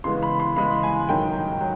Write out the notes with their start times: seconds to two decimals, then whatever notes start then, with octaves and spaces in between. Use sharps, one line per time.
0.04 C#3 E3 G#3 B3 C6
0.23 B5
0.40 C6
0.56 C#3 E3 G#3 B3 B5
0.83 G#5
1.09 G#2 D#3 F#3 G5
1.60 F#3